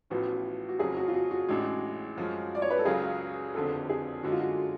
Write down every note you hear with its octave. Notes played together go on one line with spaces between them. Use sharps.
A1 A2 F3 B3 F#4
F#4
F#1 F2 C#3 F#3 G#4
F#4
F4
F#4
F#4
A1 A2 G#3 D4
F#2 F3 G#3
D5
C#5
B4
A4
C#2 C#3 F#3 C#4 F4 G#4
F#1 F2 D3 A4
G#4
F#2 D3 G#3 F#4
F4
F#4